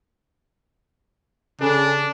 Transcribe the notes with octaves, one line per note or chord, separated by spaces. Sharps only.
C#3 D4 G#4 A4